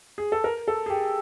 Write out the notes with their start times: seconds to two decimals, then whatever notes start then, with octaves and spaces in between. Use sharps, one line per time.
0.18 G#4
0.32 A4
0.44 A#4
0.68 A4
0.86 G#4
0.90 G4